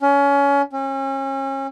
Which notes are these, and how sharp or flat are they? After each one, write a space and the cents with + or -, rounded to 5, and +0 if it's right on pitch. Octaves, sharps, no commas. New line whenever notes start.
C#4 +25
C#4 -35